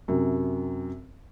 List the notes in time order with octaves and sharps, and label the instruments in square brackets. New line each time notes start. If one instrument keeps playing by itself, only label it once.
[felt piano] F#2 C3